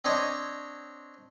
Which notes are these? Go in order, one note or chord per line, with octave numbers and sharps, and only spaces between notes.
C4 D4 C#5 D#5